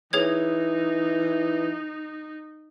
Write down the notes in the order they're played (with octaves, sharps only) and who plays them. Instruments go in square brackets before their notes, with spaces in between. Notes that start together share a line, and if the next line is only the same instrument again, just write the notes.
[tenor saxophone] E3 [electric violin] D#4 [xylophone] G#4 C#5 G#6